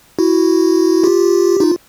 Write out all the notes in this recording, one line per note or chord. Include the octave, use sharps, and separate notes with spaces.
E4 F#4
F4 G4
D#4 F4